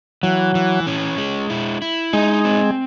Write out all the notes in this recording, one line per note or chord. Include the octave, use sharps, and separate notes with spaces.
E3 F#3
E3
C#4
G#3
E4
E4
G#3 D#4
C4